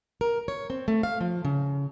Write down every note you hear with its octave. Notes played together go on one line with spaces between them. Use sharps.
A#4
C#5
C4
A3
F5
F3
C#3